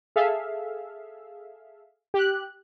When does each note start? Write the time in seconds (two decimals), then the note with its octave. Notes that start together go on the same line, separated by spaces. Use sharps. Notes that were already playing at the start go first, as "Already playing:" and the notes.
0.16 G#4 A4 E5 F5
2.14 G4 F#6